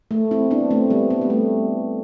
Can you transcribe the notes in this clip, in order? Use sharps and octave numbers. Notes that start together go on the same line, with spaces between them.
A3
C4 E4
B3 D4
A3 C4
G3 B3
G3 B3
B3
A3